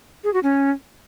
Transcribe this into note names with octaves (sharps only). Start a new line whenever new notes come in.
G#4
F#4
C#4